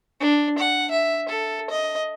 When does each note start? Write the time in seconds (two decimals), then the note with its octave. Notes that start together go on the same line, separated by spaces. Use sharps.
0.20 D4
0.58 F#5
0.91 E5
1.29 A4
1.70 D#5